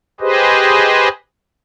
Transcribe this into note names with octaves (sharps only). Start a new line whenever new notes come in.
G4 G#4 B4 C5 D#5